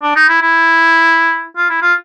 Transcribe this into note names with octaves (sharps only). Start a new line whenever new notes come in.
D4
D#4
E4
E4
F4
E4
F4